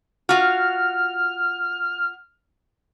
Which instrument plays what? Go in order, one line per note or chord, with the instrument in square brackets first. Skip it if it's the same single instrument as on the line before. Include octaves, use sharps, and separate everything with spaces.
[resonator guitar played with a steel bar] F4 F#4 [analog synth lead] F6